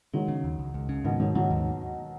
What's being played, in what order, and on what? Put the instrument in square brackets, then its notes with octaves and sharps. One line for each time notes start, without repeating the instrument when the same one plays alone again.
[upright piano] D#3 F#3 [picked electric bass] G#3
[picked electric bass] C#3
D#2
C#2
C#2
C#3
[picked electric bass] G#2 [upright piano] B2 D#3
[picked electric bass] G#2 [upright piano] D#3 F#3
[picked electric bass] G#2 [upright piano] D#3 F#3
[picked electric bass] D#2